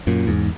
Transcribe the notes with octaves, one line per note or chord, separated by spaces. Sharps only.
F#2 A#2
E2 G#2